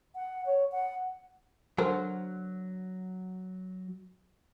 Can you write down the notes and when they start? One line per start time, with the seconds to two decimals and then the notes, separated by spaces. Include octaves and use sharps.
0.15 F#5
0.46 C#5
0.72 F#5
1.78 D3 F#3 A#4 C5